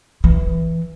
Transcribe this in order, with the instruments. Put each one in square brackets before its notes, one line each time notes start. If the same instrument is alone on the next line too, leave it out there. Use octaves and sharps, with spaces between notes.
[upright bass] E3